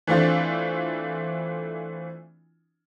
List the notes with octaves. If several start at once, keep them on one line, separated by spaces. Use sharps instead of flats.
E3 A3 C4 D4 E4 F4